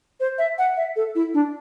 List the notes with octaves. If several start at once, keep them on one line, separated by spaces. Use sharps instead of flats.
C5
E5
F#5
E5
A4
E4
D4